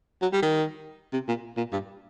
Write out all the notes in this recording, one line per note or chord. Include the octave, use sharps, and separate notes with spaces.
F#3
G3
D#3
C3
A#2
A#2
G2